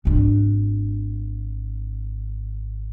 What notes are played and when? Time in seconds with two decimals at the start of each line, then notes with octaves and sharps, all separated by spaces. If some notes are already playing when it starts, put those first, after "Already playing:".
0.05 G#1 D4